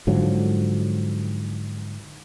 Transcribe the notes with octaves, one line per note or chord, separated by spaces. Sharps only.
G#2 D3 F3 F#3